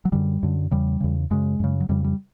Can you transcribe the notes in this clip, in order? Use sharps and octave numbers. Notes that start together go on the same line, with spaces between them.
F#3
F#2 D3 G3
F#2 D3
E2 C#3 G3
E2 C#3
F#2 C#3 G#3
F#2 C#3
F#3
F2 C#3 G3
G3